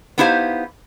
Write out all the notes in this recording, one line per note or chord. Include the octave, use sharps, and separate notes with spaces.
B3 D#4 E4 G4 C5 F5